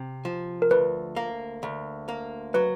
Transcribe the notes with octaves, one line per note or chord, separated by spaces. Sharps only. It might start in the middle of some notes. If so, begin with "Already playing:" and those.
Already playing: C3
F3
A#4
D2 B4
A#3
D2
A#3
F#3 B4